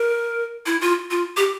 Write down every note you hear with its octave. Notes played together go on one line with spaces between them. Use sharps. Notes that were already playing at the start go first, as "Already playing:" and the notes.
Already playing: A#4
E4
F4
F4
G4